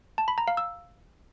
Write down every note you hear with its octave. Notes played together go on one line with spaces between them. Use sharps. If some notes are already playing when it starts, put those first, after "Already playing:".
A5
B5
A#5
F5
E6